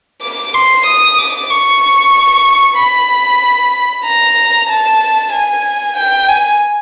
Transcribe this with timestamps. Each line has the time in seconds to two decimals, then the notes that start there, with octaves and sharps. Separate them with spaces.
0.22 D6
0.54 C6
0.86 D#6
1.19 D6
1.50 C#6
2.77 B5
4.05 A#5
4.70 A5
5.33 G#5
5.97 G5
6.29 G#5